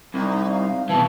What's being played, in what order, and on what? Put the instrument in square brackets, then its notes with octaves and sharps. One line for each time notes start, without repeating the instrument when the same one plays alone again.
[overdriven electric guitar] C2 [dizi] D#4
[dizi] F5
[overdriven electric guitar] B2 E3 [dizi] A5